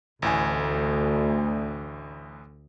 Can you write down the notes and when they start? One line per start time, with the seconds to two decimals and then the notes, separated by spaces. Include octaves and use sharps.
0.22 A1 D2 A2 G#5